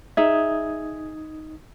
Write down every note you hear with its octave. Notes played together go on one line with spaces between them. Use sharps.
D#4 G#4 E5 D#6 G#6